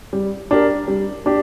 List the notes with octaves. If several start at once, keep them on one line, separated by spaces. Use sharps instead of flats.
G3
D4 G4 A#4
G3
D4 G4